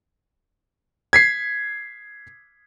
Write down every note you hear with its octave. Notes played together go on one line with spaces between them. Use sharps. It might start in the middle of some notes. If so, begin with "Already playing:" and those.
G#6 B6 C7